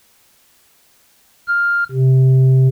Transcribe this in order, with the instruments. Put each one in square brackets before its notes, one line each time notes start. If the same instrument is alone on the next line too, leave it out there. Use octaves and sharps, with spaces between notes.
[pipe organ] F6
C3